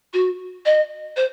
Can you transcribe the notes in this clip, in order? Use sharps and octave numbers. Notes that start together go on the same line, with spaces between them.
F#4
D#5
C5